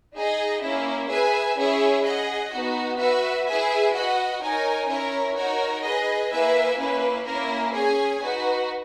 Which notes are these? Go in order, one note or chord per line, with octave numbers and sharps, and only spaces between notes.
D#4 G#4 D#5
A#3 C#4 E4
G#4 B4 E5 G#5
C#4 E4 G#4 C#5 E5
G#4 D#5 F#5
B3 D#4 F#4
F#4 B4 E5
E4 G#4 B4 E5 G#5
F#4 B4 D#5 F#5
D#4 A#4 C#5 G#5
C#4 E4 A#4 C#5
D#4 F#4 A#4 C#5
G#4 B4 D#5
A#3 E4 B4 E5 G#5
A#3 C#4 E4 B4
A#3 C#4 E4 A#4
C#4 G#4 C#5 G#5
D#4 F#4 B4